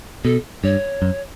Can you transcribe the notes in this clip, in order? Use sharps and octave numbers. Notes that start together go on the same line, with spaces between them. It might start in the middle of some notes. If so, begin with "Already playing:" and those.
B2 A4
G2 C#5
F#2